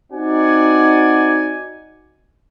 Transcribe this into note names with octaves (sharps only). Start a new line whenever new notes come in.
C4 D#4 F#4 D5 F#5 G#5